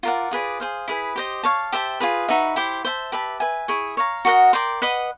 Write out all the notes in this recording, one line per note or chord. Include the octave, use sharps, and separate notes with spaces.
F4 A#4 D5 F#5
F4 G#4 B4 D5
G#4 C5 F5
E4 G#4 B4
G4 C5 D#5
C#5 F5 A5
G4 C5 E5 A5
F4 G#4 B4
D#4 F#4 B4 E5
E4 G4 C5
C5 E5 A5
G4 B4 E5 A5
B4 E5 G#5
E4 G#4 C#5
C#5 F5 A#5
F#4 A#4 D#5 F#5
A#4 D5 G5 C6
B4 D#5 F#5